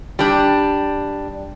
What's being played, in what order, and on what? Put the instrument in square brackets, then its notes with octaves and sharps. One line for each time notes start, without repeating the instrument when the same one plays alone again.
[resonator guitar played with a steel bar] G3 D4